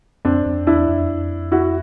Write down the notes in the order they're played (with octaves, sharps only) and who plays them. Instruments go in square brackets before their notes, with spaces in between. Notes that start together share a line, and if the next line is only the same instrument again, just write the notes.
[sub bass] F2 [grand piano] C4 D4
[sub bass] F2
[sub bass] E2 [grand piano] D4 E4
[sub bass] F2
[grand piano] E4 F#4